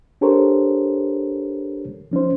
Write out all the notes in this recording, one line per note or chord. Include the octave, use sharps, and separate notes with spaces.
D4 G4 A4 A#4 C5 C#5
F3 C#4 D#4 C5